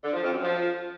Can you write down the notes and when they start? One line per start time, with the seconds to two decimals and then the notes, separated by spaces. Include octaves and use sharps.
0.04 D3
0.13 F3
0.23 F2
0.33 F#2
0.43 F3